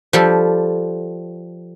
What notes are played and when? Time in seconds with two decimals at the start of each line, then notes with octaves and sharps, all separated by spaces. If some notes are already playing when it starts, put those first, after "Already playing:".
0.13 F3 G3 G4 A4